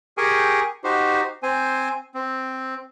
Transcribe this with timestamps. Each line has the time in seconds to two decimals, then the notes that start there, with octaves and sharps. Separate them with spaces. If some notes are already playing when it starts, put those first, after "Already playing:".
0.18 G4 G#4 A#4 G5 G#5 C#6
0.84 D#4 F#4 G4 C5
1.43 C4 C5 G#5
2.14 C4